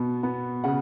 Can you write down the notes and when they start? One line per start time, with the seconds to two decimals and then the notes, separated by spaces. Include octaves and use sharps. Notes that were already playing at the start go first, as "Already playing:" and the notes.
Already playing: B2 B3
0.23 B3
0.64 C#3 F#5